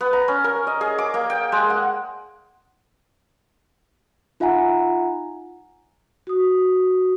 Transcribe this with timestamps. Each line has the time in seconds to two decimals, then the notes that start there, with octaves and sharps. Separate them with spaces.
0.01 B3
0.13 A#5
0.28 C#4
0.44 A#4
0.67 D#5
0.81 G#4
0.98 D6
1.14 A#3
1.30 G5
1.52 G#3
1.70 F#5
4.40 D#4 F4 E5 F#5 G#5 A#5
6.27 F#4 D#6